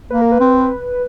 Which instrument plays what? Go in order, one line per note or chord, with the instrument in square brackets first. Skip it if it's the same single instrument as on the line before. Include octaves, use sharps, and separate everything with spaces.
[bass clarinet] A#3 [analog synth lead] B4
[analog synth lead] A#4
B4
[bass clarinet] C4